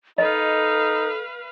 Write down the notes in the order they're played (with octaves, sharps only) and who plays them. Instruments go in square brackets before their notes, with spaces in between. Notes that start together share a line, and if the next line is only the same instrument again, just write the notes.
[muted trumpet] D#4 [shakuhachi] A4 [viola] B4 F5 [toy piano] D#5